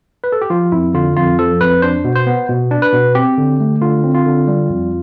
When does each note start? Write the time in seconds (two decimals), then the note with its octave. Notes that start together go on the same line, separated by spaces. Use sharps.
0.24 B4
0.32 A4
0.41 G4
0.50 F3 F4
0.72 F2 E4
0.94 D3 F4
1.16 F2 F4
1.39 F3 A4
1.61 F2 B4
1.82 D4 C5
2.05 B2
2.15 C5
2.27 B3
2.49 B2
2.71 D4
2.82 B4
2.93 B2
3.15 C4 G4
3.37 D3
3.60 A3
3.81 D3 F4
4.04 C4
4.14 F4
4.26 D3
4.48 G3
4.70 F2